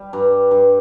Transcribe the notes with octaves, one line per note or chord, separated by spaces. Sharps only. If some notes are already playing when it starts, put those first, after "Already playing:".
Already playing: G3
G2
G2